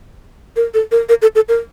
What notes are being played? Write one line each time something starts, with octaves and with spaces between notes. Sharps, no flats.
A#4
A4
A#4
A#4
A4
A4
A#4